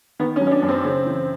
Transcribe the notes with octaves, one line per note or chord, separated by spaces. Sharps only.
D#3 B3
C#4
F#3
C#4
D4
F#2
C4
C#3
E3